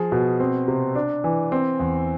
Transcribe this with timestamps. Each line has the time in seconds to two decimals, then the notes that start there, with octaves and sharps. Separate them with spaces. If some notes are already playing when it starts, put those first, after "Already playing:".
Already playing: F3 G#4
0.12 B2
0.40 C4
0.68 C3
0.95 D4
1.24 E3
1.52 C4
1.80 E2